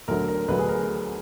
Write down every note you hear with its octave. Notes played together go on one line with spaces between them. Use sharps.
D2 D3 F#3 A#4
A#4
D2 D3 F#3 B4
G#4
A#4